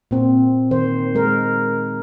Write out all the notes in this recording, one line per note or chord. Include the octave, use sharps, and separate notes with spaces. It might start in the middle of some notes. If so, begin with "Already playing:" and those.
A#2 C4
D#3 C5
G#3 A#4